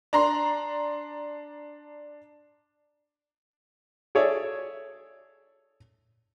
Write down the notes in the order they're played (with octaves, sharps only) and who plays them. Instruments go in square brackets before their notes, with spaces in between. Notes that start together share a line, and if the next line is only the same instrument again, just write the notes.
[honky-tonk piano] D4 A#5 C6
[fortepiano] G#4 A4 C#5 D5 E5